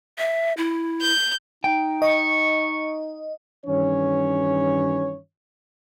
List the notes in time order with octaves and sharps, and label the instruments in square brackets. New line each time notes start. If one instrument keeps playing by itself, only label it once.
[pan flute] E5
E4
[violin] G6
[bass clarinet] D#4 [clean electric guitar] G5
[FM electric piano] D#5 [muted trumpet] C#6
[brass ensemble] G2 D#3 E3 C#4 C#5